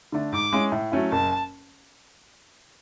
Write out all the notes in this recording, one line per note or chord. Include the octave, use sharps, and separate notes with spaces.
D3 A3 D4
G#2 D6
G#3 C#4 E4
A2
F#3 A3 C#4 E4
F#1 A5